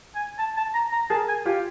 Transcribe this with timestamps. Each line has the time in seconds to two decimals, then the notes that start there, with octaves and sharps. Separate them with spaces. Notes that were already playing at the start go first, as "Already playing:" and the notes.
0.15 G#5
0.39 A5
0.57 A5
0.74 A#5
0.92 A#5
1.10 G#4 A#4 A5
1.28 G#5
1.45 F4 G4